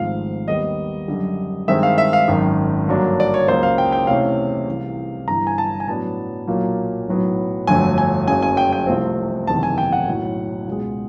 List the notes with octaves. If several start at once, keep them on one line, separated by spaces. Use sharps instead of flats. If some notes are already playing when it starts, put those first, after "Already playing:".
Already playing: G#1 G#2 F3 A3 C4 F5
D#2 D#3 G3 B3 D#5
F#2 D3 G3
G2 D#3 G#3 C4 E5
F5
E5
F5
G#1 F#2 D#3
G2 D3 F#3 A#3 D4
D5
C#5
C#2 C#3 F#3 A#3 C5
F5
G5
G5
E2 C3 E3 A3 C#4 F5
C2 C3 E3
G1 G2 E3 A#5
G#5
A5
G#5
A2 F#3 B3 D4 A5
B1 A#2 F#3 A#3
B1 A2 F#3 B3
G1 F2 D3 F#3 A3 G#5
G#5
F#1 F#2 C#3 F#3 G#5
G#5
G5
G5
C2 C3 F3 A3 C4
F#1 E2 C3 D#3 A5
G#5
G5
F#5
B1 A2 F#3
C#2 B2 G#3